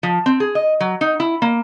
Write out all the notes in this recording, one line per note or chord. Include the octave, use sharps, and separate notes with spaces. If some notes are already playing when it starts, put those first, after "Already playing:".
F3
C4
G#4
D#5
F#3
D#4
E4
A#3